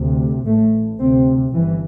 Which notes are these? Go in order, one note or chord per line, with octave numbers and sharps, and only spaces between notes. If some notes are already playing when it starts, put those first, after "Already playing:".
Already playing: D2 C3
A1 A2 A3
D2 C3 C4
G1 G2 E3